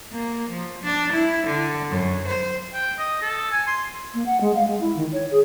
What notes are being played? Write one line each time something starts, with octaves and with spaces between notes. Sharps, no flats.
A#3
F3
D4
E4
D3
F#2
C5
G5
D#5
A4
G#5
C6
A#3
F#5
G#3
F5
G#3
E4
D#3
C#5
G#4